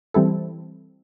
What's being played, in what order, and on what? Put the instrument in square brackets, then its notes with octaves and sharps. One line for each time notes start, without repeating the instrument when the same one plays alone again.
[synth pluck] E3 G3 C4 E4 A4